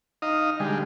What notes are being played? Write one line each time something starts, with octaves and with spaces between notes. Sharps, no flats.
D#4 D#5 F5
D3 G3 G#3